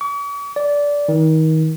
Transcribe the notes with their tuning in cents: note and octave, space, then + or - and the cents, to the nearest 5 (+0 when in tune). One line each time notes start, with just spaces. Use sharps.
C#6 +45
D5 -15
D#3 +30